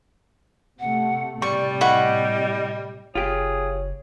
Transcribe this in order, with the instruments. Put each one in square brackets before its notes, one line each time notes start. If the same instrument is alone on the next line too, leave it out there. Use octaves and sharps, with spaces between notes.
[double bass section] C3 A3 [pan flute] F#5
[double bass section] A2 C3 [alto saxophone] G3 [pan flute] D5 [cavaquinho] C#6
[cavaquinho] E4 F#5 C#6 [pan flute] D#5
[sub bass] F#1 [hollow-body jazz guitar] F4 G4 [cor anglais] G#4 [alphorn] C#5